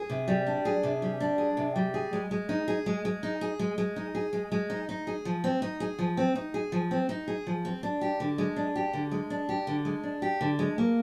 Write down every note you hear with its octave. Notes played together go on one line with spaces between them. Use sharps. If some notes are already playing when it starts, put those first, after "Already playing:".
Already playing: G#4
C3
G3
D4
G#4
C3
G3
D4
G#4
C3
G3
G#4
G#3
G#3
D#4
G#4
G#3
G#3
D#4
G#4
G#3
G#3
D#4
G#4
G#3
G#3
D#4
D#4
G#4
F3
C4
D#4
G#4
F3
C4
D#4
G#4
F3
C4
D#4
G#4
F3
C4
D4
G4
D3
G#3
D4
G4
D3
G#3
D4
G4
D3
G#3
D4
G4
D3
G#3
A#3